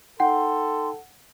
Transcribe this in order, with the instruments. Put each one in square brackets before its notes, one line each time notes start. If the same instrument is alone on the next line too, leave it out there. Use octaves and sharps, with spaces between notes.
[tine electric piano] D#4 G5 [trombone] A4 [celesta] F#5 [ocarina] C6